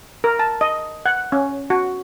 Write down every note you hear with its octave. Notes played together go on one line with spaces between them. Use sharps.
A#4
A5
D#5
F#5
C#4
F#4